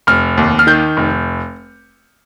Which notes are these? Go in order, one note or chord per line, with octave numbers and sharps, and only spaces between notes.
F1 F6
D#2
F6
D#3 G6
F1